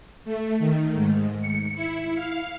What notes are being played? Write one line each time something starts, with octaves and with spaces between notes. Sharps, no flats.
A3
D#3
G#2
C#7
E4
F5